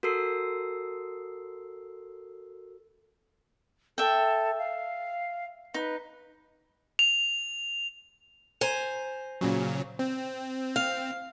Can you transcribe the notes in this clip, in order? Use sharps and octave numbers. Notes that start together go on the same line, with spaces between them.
F#4 A4 A#4 E6 C7
A4 E5 G5
F5
D#4 B4
F7
C5 G#5 A#5
A#2 C#3 F#3
C4
F5